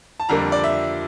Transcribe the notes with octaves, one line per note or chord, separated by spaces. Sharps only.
A5
F2 D3 G3 A#3 A#5
D5
E5